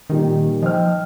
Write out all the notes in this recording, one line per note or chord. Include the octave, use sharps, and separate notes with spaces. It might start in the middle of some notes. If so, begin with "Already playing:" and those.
A#2 D#3 G3 D#4
F3 D#5 G5 F6